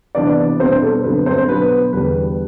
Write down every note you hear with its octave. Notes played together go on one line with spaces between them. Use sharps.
C3 E3 B3 D4 D5
B2 G3 C4 D4 C5
A4
G2 D3 F#3 C4 B4
C4 C5
B2 F#3 B3 D4 B4
E2 D3 G3 D4 B4